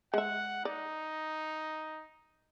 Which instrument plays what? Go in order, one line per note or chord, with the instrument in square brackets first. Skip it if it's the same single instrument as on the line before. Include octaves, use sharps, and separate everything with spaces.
[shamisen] G#3 E5 [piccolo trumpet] F#5
[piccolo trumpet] D#4 [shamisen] D5